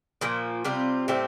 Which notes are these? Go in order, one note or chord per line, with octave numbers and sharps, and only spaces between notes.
A#2 F3 A#3
C3 G3 C4 F4
A2 G3 C4 E4